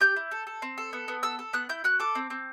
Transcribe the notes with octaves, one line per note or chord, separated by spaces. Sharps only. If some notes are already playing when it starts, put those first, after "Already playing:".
G4 G6
E4
A4
A4
C4
A4
B3
B3
A4 E6
A4
B3 F#6
E4 G6
F#4 F#6
A4 D6
C4
C4